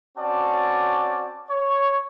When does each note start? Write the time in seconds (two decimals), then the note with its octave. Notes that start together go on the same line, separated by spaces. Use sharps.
0.18 C4 C#4 F#4 D5 A5
1.50 C#5